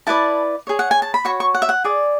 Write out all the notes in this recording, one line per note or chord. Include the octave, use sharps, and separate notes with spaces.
E4 B4 D5 A5
G#4 C#5
F#5
G#5
A5
B5
F#4 C#5 C#6
C#6
F#5
E5
F#5
G#4 D5